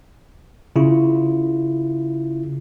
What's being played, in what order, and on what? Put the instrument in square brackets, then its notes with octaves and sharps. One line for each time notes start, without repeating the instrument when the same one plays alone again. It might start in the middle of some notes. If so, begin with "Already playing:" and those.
[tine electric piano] C#3 E4 F4